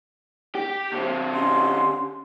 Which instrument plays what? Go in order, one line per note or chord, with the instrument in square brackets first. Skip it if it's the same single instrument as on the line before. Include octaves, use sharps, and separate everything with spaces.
[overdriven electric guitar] G4
D3 C4
[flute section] C#4 G4 C6